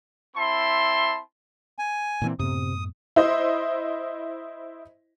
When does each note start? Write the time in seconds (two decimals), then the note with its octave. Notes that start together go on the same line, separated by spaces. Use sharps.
0.36 C4 E4 A5 B5 C6
1.78 G#5
2.22 A#2 E3 C4
2.39 F#2 A2 C3 B3 D#6
3.16 E4 C5 D#5